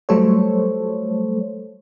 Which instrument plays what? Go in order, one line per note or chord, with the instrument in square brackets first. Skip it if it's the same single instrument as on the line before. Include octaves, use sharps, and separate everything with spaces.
[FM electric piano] F#3 G3 A3 A4 C5 C#5